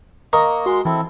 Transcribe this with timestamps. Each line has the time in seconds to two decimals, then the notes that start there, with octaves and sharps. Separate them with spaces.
0.33 A#3 A#4 D#5 A#5 C#6
0.66 G#3 F#4 C6
0.85 E3 C4 E4 A4